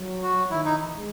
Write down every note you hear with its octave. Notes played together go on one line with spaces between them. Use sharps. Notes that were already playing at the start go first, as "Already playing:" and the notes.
Already playing: F#3
F#4
D#3 E4
D#4
E3
G#3